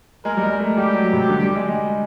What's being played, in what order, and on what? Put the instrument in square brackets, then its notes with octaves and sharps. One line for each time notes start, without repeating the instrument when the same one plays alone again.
[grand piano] G#3 [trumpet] A#4
[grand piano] G3
G#3
A3
[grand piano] G3 [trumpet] G4
[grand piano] F#3
C3
D3
G3
G#3
G#3